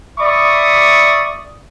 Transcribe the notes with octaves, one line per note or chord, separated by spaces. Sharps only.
D5 E5 B5 C#6 D#6